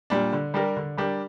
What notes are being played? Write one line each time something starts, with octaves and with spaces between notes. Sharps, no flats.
A#2 G3 D4
D3
G3 D4 G4 A#4
D3
G3 D4 G4 A#4